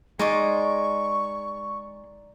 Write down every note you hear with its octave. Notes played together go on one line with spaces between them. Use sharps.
G#3 D#4 D5 C6 C#6